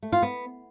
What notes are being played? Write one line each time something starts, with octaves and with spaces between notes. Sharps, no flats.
A3
F4
B3